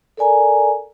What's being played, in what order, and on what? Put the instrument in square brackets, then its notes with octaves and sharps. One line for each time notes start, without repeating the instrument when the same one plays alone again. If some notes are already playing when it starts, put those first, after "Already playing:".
[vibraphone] A4 A#4 D5 G#5 A#5